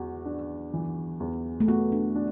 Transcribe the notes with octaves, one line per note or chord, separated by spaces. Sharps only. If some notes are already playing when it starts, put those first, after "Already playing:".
Already playing: E2 F#4
D4
E3
E2
A3
B3 F#4
D4
D4